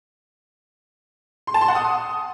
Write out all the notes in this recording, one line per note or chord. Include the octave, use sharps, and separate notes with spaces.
C6
A5
C6
F#5
D#6